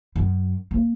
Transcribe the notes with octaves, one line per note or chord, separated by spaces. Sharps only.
F#2 D4
A#3